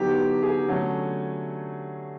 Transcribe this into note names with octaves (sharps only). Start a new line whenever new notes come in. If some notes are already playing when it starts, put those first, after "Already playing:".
Already playing: D3 F#3 B3 D#4 G4
G#4
D3 F#3 A3 C#4